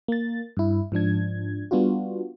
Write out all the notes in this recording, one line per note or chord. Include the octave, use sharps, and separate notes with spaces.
A#3 A6
G2 E4
G#2 F3 D4 G#6
G3 B3 D4 F4 F#4